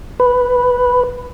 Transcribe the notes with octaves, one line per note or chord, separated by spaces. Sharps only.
B4